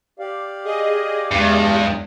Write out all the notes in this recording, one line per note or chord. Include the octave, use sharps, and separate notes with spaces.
G4 D5 F5
G#4 D#5
E2 G2 G#3